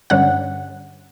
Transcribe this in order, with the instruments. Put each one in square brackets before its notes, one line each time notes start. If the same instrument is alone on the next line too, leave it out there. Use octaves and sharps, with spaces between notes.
[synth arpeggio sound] G2 D3 G3 C#4 F#5